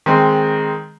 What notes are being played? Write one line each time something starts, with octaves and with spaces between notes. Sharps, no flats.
D#3 G#3 C4